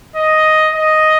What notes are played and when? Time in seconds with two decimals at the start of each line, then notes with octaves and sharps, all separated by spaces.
0.16 D#5
0.74 D#5